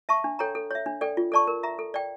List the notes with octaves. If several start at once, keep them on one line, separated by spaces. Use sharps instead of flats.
E5 A5 C#6
D4
A4 C#5 G5 A#5
A4
C#5 E5
D4
A4 D5 G5
F4
A4 D5 A5 C#6
A#4
E5 A#5
A4
D5 G5